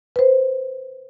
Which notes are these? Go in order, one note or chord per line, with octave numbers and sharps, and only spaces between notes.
B4 C5